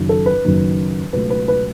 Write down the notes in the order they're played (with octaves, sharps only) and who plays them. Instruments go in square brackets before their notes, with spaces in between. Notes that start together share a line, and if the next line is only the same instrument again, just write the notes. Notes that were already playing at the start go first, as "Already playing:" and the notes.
Already playing: [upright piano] F#1 F#2 D#3
A4
B4
F#1 F#2 D#3
C#2 B2 F#3 A3 B4
B4
B4